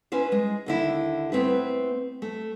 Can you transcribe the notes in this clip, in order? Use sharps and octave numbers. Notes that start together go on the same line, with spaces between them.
C#4 E4 B4 C5
G#3
D#2 D3 E4
A3 B3 C4 E4 B4
A3